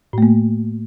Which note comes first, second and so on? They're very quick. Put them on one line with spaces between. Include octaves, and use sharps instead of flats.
A2 A3 A#3